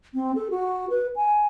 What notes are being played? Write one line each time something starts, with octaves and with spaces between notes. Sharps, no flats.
C4
A4
F#4
B4
G#5